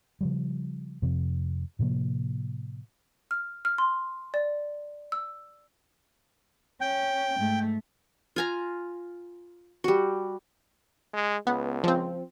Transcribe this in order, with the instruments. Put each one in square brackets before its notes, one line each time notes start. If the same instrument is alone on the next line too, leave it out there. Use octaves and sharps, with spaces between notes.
[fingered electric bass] C#3 F3 G3
F2 C3 F3 C4
A2 C3 F3 A#3
[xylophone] F6
F6
C6
D5
E6
[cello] C#4 [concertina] G5
[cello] G#2 A3
[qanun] F4 G#5 A#5
G3 F#4
[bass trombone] G#3
[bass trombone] C#2 [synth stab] B3
[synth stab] F3 C4